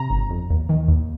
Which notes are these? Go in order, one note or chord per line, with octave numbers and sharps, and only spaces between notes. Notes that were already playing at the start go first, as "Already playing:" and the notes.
Already playing: C3 A#5
G1
F2
D#2
D#3
D#2